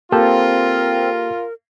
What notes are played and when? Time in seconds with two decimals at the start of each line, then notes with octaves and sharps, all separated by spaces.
0.12 A#3 C4 F4 G4 A4 A#4